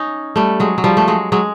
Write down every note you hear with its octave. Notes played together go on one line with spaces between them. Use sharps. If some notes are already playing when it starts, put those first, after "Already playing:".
Already playing: C#4 D#4
G3 A3
F#3 G#3
F#3
F3 G3
A3
F#3 G#3
F#3 G#3